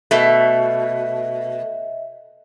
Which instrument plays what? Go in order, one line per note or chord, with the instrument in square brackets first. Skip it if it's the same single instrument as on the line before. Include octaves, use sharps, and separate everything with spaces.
[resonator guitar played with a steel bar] B2 A3 [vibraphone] D#5 E5